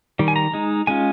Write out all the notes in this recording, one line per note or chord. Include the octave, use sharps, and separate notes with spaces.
D#3 G3
G#5
A#5
G#3 D#4
G#3 C#4 F4 G#5